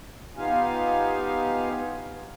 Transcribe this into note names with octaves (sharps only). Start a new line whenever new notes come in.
B3 D#4 F4 G4 F5 G#5